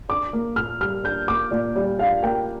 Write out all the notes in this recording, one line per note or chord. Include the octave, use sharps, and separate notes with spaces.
D4 D6
A#3
A#2 F6
G3 F6
D4 G6
A#3 D6
A#2 D5
G3 D5
D4 F5
A#3 G5